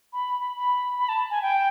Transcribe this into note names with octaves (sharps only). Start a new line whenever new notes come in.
B5
B5
B5
A5
G#5
G5